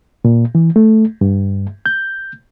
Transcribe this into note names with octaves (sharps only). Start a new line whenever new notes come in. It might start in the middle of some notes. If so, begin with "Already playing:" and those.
A#2
E3
A3
G2
G6